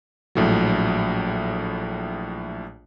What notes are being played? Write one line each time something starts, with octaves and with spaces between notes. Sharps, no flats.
A#1 A2 F#3